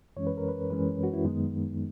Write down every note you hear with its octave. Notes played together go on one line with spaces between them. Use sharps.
F#2 E3 G#3 C#4 C#5
B4
A#4
B4
F#2 E3 G#3 C#4 B4
F#4
E4
F#2 D#3 G#3 B3 D#4